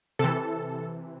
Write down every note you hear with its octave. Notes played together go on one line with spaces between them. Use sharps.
C3 E3 A4